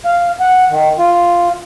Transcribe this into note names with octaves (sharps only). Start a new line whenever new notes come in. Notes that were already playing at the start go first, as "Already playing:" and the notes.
F5
F#5
D#3
F4